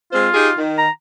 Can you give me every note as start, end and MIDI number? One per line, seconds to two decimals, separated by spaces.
0.13 0.28 56
0.13 0.28 60
0.13 0.58 65
0.13 0.28 72
0.34 0.50 63
0.34 0.50 67
0.34 0.50 68
0.57 0.85 51
0.78 0.90 82